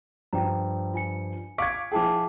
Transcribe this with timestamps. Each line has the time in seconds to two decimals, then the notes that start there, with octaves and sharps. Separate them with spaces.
0.33 G2 F3 G5 A#5
0.94 F4 G#5 C#7
1.58 F5 C#6 D6 G#6 B6
1.92 F3 E4 G#4 G5 A5 D6